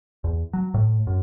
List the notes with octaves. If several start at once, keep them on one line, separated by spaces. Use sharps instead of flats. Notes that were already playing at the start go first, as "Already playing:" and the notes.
E2
F#3
A2
F#2